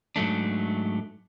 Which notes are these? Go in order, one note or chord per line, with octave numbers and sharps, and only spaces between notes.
G#2 F#3 A3 D4